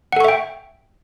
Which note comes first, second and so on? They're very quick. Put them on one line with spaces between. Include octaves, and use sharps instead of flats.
F#5 A4 C#6 E5 G5